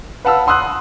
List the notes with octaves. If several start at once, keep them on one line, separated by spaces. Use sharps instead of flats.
B4 F5 F#5 A5 B5 E6
F#5 C6 D#6 E6 F#6